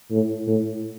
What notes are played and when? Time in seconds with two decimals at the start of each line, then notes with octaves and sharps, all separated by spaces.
0.11 A2
0.47 A2